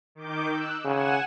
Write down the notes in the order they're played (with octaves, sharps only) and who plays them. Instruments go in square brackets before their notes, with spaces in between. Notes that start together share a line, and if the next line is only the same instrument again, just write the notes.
[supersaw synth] D#3 D6 G6
E6 F#6
[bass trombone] C#3 [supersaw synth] F#5 G#5 E7